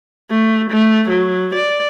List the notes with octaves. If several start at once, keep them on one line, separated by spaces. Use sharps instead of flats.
A3
A3
F#3
D5